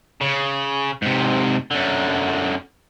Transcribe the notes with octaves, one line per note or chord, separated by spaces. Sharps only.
C#3
G#2 C3
F#2 D3